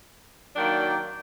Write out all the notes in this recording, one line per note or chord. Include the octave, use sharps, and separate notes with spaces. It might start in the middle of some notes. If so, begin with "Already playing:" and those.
D#3 F#3 A#3 D4 D5 G5